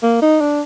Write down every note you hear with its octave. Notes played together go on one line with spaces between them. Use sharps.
A#3
D#4
D4